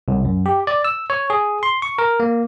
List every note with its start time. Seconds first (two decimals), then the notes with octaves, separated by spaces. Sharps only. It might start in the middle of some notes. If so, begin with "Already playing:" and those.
0.08 C2
0.25 F#2
0.46 G4
0.67 D5
0.85 E6
1.10 C#5
1.30 G#4
1.63 C6
1.82 C#6
1.99 A#4
2.20 A#3